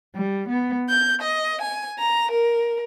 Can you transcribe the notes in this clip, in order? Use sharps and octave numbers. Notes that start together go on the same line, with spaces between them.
G3
B3
G6
D#5
G#5
A#5
A#4